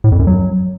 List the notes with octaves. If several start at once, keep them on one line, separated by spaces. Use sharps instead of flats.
A2
F2
F#2
F#3